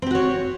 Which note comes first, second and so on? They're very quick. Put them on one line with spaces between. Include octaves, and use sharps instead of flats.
C4 G4 F#4 C#5